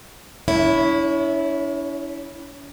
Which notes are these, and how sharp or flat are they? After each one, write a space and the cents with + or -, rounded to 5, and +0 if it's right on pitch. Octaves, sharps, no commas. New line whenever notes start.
C#4 +45 E4 -10 C#5 +10